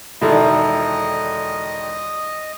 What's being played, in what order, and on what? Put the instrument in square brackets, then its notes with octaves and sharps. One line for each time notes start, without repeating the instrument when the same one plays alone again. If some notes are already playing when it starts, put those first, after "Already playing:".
[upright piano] E1 D3 D#3 [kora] E4 A4 [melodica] D#5